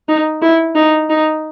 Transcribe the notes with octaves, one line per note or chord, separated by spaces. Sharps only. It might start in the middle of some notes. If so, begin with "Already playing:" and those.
D#4
E4
D#4
D#4